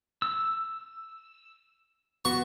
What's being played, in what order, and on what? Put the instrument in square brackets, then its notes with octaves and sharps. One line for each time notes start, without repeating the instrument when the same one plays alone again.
[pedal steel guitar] E6
[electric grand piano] B3 F#4 [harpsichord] C#6